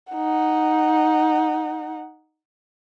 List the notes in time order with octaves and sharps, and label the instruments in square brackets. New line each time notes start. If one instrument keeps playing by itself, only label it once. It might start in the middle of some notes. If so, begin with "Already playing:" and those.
[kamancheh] D#4 F#5